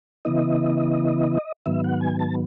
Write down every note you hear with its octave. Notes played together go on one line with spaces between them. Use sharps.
C#3 E3 B3 E4 D#5
G#2 D#3 F#3 B3 E5
F#5
G#5
A5